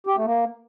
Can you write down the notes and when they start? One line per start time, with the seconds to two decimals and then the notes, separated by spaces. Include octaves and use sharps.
0.07 G4
0.16 A3
0.26 A#3